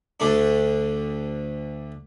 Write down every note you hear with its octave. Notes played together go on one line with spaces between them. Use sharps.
D2 A3 D4